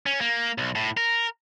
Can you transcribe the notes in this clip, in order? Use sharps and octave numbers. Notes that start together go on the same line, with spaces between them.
C#4
A#3
B1
A2
A#4